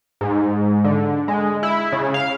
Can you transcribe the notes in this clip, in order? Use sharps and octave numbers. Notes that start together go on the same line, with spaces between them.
G#2
D3
G#3
E4
C#3
F5